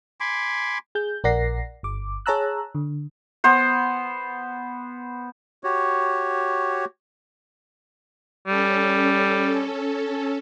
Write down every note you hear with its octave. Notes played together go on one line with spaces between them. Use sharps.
G#5 B5 C6 D6
G#4 G6
A#1 A#4 D5 F#5 A#6 C7
G1 D6
G#4 C#5 A5 A#5 E6 F#6
D3
B3 C5
F#4 G4 C#5
G3 C#4 A4